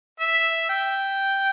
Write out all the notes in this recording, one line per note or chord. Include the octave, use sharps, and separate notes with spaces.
E5
G5